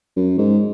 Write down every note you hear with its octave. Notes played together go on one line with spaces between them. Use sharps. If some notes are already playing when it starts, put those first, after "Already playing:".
F#2
G#2